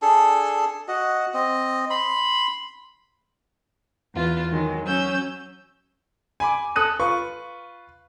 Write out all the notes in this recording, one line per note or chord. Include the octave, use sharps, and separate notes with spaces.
D4 G#4 A4
F#4 D#5
C4 D#5
B5 C6
E2 F4 B4
D#3 F#3 G#3
F#3 C#4 E6 G6
G#5 B5 D6
A4 D#6 F#6 D#7
F4 B4 C#6